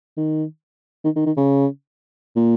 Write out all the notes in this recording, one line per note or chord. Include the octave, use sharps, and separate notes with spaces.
D#3
D#3
D#3
D#3
C#3
A#2